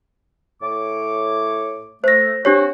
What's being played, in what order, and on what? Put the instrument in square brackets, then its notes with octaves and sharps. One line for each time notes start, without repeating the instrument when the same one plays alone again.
[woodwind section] A2 C#5 D6
[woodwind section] A3 [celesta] C5 A#6
[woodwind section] C4 F#4 [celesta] D4 G4 C#5